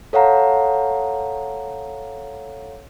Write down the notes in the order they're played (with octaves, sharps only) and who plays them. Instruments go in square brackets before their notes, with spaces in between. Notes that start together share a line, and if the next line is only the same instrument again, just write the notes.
[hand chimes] A4 C#5 F5 F#5 A#5